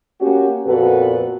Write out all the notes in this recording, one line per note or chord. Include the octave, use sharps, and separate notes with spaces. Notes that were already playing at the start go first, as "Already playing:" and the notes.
A#3 C#4 F#4 G4
F2 A#2 B3 F#4 A4 B4